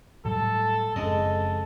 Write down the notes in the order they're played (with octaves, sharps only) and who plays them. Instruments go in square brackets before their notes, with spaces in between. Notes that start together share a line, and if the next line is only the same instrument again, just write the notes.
[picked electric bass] A2 F#3 G3 [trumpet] A4
[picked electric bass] F#1 C#4 D4 [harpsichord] F2 G#3 D#5 [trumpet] A4